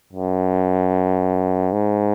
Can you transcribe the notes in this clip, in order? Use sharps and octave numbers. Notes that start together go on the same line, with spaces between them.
F#2
G#2